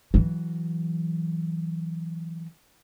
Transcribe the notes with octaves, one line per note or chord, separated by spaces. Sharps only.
E3 F#3